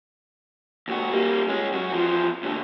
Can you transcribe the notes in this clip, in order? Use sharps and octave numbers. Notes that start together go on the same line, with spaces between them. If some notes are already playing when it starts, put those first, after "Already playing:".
D#2 F#4
G3 A#3
G#3 C#4
F#2 F#4
E2 F3
D#2 D3